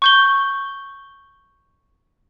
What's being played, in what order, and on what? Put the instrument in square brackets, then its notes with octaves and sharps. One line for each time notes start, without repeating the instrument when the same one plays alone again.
[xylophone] C#6 G6 G7